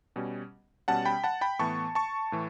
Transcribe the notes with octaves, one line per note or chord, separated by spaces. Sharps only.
B2 G3 C#4
B2 G3 C#4 F#5 A5
G5 B5
F#5 A5
G5 B5
A2 E3 B3 A5 C#6
A5 C#6
A2 E3